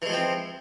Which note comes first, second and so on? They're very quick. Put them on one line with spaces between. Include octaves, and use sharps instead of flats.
E3 G#3 F3 C4